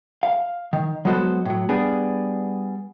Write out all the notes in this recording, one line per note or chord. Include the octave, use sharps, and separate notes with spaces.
F5
D#3
F#3 G#3 B3 F#4 A4 C5
A2 F#3
G3 B3 D4 G#4